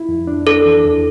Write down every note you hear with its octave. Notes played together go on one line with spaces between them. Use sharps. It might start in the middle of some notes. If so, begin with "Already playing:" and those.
Already playing: E4
F2
D4
D4 A4
E3
E2